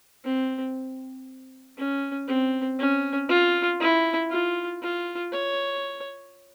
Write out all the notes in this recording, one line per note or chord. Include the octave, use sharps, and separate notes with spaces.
C4
C#4
C4
C#4
F4
E4
F4
F4
C#5